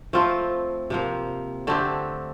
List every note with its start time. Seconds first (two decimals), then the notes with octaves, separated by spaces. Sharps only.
0.13 F3 A3 C4 F4
0.90 C3 F3 A#3
1.67 D3 A3 C4 G4